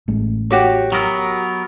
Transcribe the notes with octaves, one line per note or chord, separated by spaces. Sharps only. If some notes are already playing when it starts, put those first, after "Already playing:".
A1 G#3 A3
F#4 G4 C#5
F#3 B3 A#4